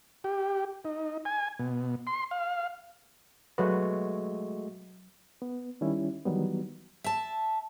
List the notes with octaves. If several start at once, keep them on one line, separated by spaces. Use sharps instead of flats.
G4
D#4
G#5
B2
C6
F5
F#3 G#3 A3 F#4 B4
B3
D#3 G3 C#4 E4
D#3 E3 F#3 G3 B3
E5 A5